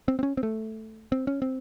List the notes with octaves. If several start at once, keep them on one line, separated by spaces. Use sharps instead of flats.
C4
C4
C#4
C4
A3
C4
C#4
C4